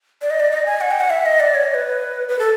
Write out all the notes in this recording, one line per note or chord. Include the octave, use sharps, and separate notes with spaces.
D5
D#5
D5
D#5
G#5
F#5
G5
F#5
E5
D#5
D5
C#5
C#5
B4
B4
A4